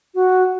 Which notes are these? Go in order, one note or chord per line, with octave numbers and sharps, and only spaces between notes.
F#4